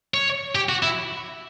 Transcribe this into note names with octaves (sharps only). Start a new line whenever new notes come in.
C#5
G4
F#4
E4